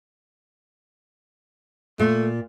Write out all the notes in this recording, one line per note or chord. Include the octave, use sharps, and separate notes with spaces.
A#2 A3